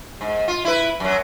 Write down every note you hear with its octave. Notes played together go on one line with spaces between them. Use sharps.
G#2
F4
E4 B4
F#2 F#3